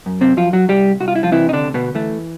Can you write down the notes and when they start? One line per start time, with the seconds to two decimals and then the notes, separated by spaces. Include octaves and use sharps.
0.06 F#2
0.21 C3 C4
0.37 F#2 F3 F4
0.53 F#3 F#4
0.69 C2 G3 G4
1.00 C2 F#4
1.08 F4
1.16 E4
1.23 F3 F4
1.32 C3 E3 E4
1.49 D#4
1.53 D3 D4
1.64 D2
1.74 B2 B3
1.95 E3 A3